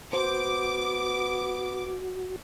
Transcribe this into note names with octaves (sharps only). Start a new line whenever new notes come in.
B3 F#4 C5 D6